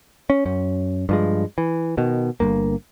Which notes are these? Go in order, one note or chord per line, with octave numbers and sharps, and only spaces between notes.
C#4
F#2 C#4
G2 F3 G#3
E3
B2 D#3
G1 G2 A#3